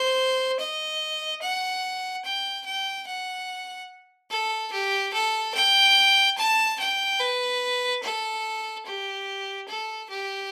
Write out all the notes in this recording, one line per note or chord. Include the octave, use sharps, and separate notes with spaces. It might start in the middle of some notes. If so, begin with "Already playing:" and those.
Already playing: C5
D#5
F#5
G5
G5
F#5
A4
G4
A4
G5
A5
G5
B4
A4
G4
A4
G4